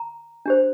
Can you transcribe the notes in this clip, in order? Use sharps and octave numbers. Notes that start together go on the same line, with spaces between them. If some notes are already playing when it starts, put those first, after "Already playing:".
Already playing: A#5
D4 G4 C5